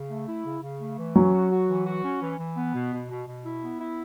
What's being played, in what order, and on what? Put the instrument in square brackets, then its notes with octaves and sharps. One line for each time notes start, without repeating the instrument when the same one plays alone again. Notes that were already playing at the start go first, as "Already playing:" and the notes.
Already playing: [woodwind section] C#3
A3
E4
C#3
C#3
A3
E3
[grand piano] F#3 [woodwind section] C#4
[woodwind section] F#4
F#4
E3
F#4
C#4
E3
E3
B3
B2
B2
B2
B2
E4
B3
E4